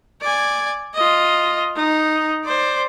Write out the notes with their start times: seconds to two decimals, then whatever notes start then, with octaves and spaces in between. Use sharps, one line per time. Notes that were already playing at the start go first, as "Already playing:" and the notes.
0.21 D5 G#5
0.95 F4 D#5
1.76 D#4
2.45 C5 D5